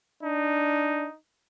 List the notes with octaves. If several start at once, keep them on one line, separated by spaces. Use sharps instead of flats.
D4 D#4